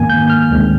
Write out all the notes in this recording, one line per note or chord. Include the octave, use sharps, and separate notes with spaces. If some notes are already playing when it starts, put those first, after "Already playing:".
Already playing: G#2 D#3 A#3 G#5
G6
F6
D2 C3 D#3 G#3 C4